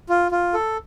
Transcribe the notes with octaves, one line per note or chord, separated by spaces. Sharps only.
F4
F4
A4